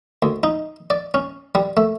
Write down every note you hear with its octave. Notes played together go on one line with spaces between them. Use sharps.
D2
D#4
D5
C#4
G3
A3